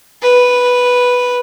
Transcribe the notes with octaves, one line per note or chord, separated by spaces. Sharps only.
B4